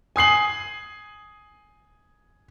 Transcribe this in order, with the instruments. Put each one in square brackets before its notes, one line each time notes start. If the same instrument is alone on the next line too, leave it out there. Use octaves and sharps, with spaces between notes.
[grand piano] G#5 D#6 C7 F#7